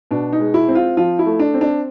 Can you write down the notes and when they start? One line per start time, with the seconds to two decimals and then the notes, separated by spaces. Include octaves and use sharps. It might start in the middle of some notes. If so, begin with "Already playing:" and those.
0.11 B2 D4
0.33 D#4
0.40 G#3
0.54 E4
0.68 C4
0.75 F4
0.97 F3 F4
1.19 E4
1.26 A3
1.40 D4
1.54 C4
1.61 D4